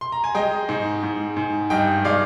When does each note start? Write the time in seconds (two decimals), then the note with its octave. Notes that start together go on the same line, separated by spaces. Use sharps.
0.01 C6
0.12 A#5
0.24 G#5
0.35 G#3 D#5 G5
0.69 G#2
1.03 G#2
1.37 G#2
1.70 G2 D#5 G5
2.04 G#3 D5 F5